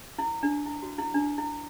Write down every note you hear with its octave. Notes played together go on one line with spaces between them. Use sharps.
E4
D4
E4
F#4
E4
D4
E4